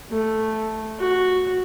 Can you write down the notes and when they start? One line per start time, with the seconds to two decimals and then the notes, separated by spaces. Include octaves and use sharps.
0.10 A3
0.99 F#4